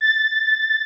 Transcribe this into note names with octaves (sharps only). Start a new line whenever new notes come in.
A6